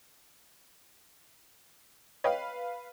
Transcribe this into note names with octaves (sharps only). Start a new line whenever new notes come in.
B4 C#5 D#5 F5 G5